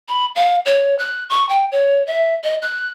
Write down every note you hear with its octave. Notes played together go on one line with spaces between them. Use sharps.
B5
F5
C#5
F#6
C#6
G5
C#5
E5
D#5
F#6